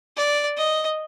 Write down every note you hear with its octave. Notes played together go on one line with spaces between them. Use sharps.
D5
D#5